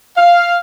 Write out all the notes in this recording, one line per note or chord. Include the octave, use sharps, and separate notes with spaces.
F5